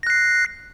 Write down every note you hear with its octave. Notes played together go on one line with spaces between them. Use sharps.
F#6 A#6 C7